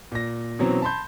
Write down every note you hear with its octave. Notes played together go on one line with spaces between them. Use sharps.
A#2 A#6
B2 E3 F#3 C4 C#4
A5 B5 C6 G6